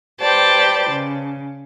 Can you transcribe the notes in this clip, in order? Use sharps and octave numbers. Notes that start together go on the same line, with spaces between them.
G4 B4 C5 D5 G5 A5
C#3